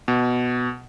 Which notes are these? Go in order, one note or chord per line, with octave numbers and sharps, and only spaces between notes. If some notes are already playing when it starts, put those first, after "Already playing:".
B2